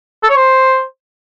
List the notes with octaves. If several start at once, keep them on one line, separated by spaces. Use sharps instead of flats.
A4
C#5
C5